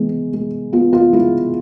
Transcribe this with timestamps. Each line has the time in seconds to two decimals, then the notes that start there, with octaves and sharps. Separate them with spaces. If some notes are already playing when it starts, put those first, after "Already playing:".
Already playing: E3 G#3 B3
0.33 G#3
0.73 B3 F4
0.93 F4
1.13 G#3 E4